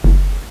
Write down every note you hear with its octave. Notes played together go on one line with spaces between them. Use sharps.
F#1